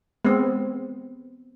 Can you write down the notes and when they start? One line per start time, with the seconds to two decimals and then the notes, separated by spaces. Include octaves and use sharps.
0.25 G#3 B3 C4